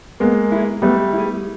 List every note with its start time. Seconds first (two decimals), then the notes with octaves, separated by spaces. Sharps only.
0.20 G#3 A#3 B3
0.52 E4 G#4
0.82 G3 A3 B3
1.13 E4 G#4